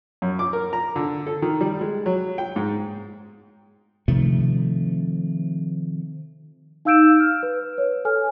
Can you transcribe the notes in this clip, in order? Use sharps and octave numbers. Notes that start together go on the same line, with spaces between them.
F#2
D6
A#4
A#5
D3
A4
D#3
G3
G#3
F#3
G5
G#2
C3 D#3 F3 A3
D#4 F5 E6 G6 D7 E7
F6
B4
C#5
A4 G#5 F6